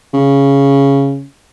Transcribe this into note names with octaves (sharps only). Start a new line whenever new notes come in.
C#3